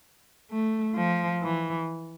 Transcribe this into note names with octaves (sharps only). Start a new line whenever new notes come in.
A3
F3
E3